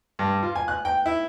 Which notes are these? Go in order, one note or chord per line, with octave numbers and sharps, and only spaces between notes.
G2
F4
G#5
F#6
G5
E4